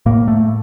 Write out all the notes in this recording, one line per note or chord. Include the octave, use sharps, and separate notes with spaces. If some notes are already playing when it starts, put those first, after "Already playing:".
A2 A#3
A3